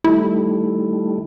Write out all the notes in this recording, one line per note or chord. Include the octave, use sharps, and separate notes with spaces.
D#3 G3 A3 E4